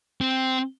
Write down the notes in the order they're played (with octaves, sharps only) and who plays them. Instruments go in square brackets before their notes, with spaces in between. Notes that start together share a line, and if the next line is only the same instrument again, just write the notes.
[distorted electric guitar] C4